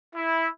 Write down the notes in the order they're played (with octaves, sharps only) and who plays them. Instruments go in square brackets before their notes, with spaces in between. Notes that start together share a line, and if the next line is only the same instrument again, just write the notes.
[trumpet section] E4